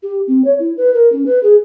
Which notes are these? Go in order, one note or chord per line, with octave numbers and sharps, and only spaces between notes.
G4
C4
C#5
E4
B4
A#4
C#4
B4
G#4